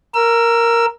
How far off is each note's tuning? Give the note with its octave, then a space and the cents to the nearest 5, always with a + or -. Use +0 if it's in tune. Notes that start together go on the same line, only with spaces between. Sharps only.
A#4 +0 E6 +20